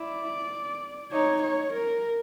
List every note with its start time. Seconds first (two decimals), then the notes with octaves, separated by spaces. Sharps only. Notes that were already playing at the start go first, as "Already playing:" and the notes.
Already playing: E4 D5
1.12 D#4 C#5
1.43 C#5
1.73 A#4